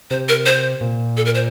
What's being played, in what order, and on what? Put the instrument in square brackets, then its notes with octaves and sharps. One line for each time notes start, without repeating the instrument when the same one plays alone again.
[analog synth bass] C3 [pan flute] C5
[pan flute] A#4
C5
[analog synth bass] A#2
[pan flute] A4
A#4
C5